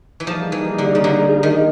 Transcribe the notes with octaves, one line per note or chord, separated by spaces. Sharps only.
E3
F3 G3 A#3 D#4 G#4
E3
D3
C#3
D3
D#3